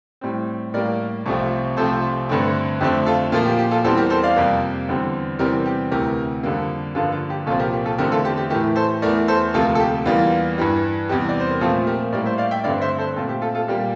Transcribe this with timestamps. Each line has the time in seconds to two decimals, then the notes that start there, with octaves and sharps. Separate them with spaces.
0.21 A2 G3 C4
0.74 A2 G3 A#3 A#4 D5
1.26 C2 C3 F3 A3 C4
1.77 C2 C3 F3 A3 C4 A4 C5
2.29 G2 D3 A3 C4
2.80 F2 D3 A3 C4 G4
3.06 F4 A4
3.32 A#2 F3 A#3 F4 A4
3.46 G4
3.59 G4
3.71 F4 A4
3.84 E2 E3 G3 C4 A4 C5
3.97 G4 A#4
4.10 A4 C5
4.23 D5 F5
4.36 F2 C3 G3 A#3
4.89 E2 D3 G3 C4
5.39 E2 C3 E3 G3 C4 G4 A#4
5.66 G4
5.91 D2 C3 E3 G4 A#4
6.43 F2 D3 G3 A#3
6.95 G2 D3 F3 A#3 F4 A4
7.12 F4
7.30 G4
7.46 C2 A#2 F3 C4 F4 A4
7.59 G4 A#4
7.73 G4
7.86 F4 A4
7.98 E2 D3 A3 C4 G4 A#4
8.12 F4 A4
8.25 G4
8.37 G4
8.50 A2 E3 A3 G4 A#4
8.76 A4 C5
9.02 E2 E3 A3 A#4 D5
9.28 A4 C5
9.54 D2 C3 F3 A#3 F4 A4
9.75 A4
9.80 G4
10.05 E2 E3 G3 A#3 F4
10.58 G2 E3 G3
11.09 E2 C3 G3 G4
11.29 D5
11.40 C5
11.50 A#4
11.61 A#2 F3 A3 C4 F4 A4
11.87 G4 A#4
12.13 A2 G3 A#3 A#4 D5
12.25 C5 E5
12.38 D5 F5
12.51 E5 G5
12.64 G2 D3 A3 C4 D5 F5
12.81 C5 E5
12.98 A4 C5
13.16 A#2 A3 C4 F4 A4
13.29 G4
13.42 F4 A4
13.55 F4 A4
13.68 A#2 G3 A#3 G4 A#4